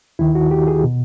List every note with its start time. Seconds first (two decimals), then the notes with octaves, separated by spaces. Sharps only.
0.19 D#2 D#3 E4
0.35 F#4
0.51 G4
0.68 G#4
0.84 B2